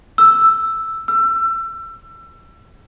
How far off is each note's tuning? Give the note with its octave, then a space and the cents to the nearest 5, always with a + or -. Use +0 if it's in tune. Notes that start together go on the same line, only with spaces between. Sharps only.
E6 +5
E6 +30